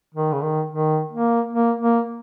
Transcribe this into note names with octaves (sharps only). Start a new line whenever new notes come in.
D#3
C#3
D#3
D#3
A#3
A#3
A#3